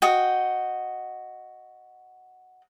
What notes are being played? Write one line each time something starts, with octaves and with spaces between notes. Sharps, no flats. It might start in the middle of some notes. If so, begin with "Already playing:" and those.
F#4 D#5 G5